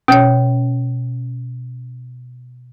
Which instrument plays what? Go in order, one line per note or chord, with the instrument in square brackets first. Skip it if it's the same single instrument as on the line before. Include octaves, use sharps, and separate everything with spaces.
[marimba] B2 C#5 [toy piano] C#4